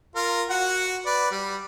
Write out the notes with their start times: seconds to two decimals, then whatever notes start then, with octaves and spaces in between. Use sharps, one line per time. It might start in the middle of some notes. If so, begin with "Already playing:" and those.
0.15 F4 A#4
0.50 F#4 F#5
1.06 B4 D5
1.31 G3